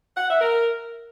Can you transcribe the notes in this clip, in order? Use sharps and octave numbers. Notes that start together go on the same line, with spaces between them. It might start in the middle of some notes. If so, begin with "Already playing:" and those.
F#5
E5
A#4